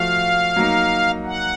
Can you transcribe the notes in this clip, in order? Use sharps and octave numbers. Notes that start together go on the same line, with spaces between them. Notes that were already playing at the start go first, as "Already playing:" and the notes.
Already playing: F3 A3 F#4 F5
F#3 A#3 D#4
F#5